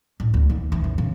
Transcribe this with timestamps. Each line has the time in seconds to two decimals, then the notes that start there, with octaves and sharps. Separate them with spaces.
0.20 A1
0.34 D2
0.50 D#2
0.72 E3
0.84 F#2
0.98 C#3